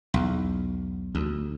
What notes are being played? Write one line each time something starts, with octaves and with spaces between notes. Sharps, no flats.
B1 E2
D2